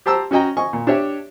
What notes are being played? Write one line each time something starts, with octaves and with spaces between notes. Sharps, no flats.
G4 C5 A5 A#5 E6
C#4 F#4 D#5 G5 A#5
D#5 G#5 C#6
A#2
D4 G4 C#5 E5